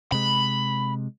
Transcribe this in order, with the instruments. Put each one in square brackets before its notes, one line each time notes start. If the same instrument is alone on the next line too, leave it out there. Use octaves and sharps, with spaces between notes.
[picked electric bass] C3 G#3 [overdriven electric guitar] B5